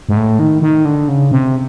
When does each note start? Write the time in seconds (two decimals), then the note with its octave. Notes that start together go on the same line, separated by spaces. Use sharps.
0.09 G#2
0.17 A2
0.39 D#3
0.62 D#3
0.85 D3
1.08 C#3
1.32 C3